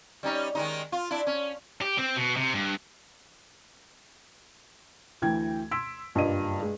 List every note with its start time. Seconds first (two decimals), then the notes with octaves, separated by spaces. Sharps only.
0.23 G3 C#4 D#4
0.55 D#3 G#3 D#4
0.92 F4
1.10 D4 E4
1.27 C#4
1.82 G4
1.98 C4
2.16 B2
2.37 C3
2.53 G2
5.22 D2 E3 G5 G#6
5.71 C6 E6 G#6 B6 D7
6.15 F#1 G2 G3 F4 D#5 D#7
6.62 G#3